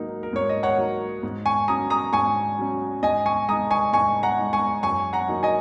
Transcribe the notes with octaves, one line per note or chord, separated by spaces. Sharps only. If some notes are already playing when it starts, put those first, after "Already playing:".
Already playing: G#2 F#3 A#3 D#4
A#4
G#2 C#5
D#5
C#5 F#5
F#3 A#3 D#4
G#2
G#5 C#6
F#3 C#4 A#5 D#6
A#5 D#6
G#2 G#5 C#6
F#3 C#4
G#2 D#5 G#5
G#5 C#6
G#3 D#4 A#5 D#6
G#5 C#6
G#2 G#5 C#6
F#5 A#5
G#3 D#4
G#5 C#6
F#2 G#5 C#6
F#5 A#5
F#3 A#3 D#4
D#5 G#5